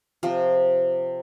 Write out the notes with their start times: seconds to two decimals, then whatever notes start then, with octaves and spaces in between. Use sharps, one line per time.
0.23 C3 F3